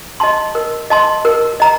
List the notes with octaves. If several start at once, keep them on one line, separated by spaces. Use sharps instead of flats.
D#5 A5 C6
A#4
D#5 A5 C6
A#4
D#5 A#5